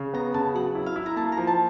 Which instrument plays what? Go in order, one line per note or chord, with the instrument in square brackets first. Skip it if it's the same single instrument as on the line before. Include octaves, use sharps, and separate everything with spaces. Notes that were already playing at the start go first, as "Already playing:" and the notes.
Already playing: [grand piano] C#3
[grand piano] B3 [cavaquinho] A#5
[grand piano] C#3 [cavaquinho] A5
[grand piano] F#3 [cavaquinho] F#5
[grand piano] E4
[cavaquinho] F5
[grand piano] E4
[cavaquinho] A#5
[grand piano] A#3 [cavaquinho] A5
[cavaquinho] A#5
[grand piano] F3
[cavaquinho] A5